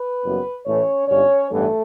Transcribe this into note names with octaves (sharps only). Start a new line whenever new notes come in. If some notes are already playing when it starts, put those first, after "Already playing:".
Already playing: B4
F#1 F#2 E3 G3 B3
A1 A2 E3 A3 C#4 C#5
G1 G2 D3 C#4 C#5
A1 G2 E3 G3 A3 B3 A4